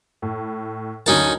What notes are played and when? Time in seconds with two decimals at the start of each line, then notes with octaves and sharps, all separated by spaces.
0.22 A2
1.06 D2 F#3 A#3 C#4 D#4 A5